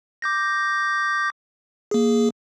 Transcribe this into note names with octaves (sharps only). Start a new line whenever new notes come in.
D6 G6 A#6
A#3 G#4